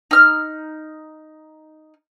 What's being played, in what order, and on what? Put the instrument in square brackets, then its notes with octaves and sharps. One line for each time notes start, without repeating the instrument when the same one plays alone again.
[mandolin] D#4 F6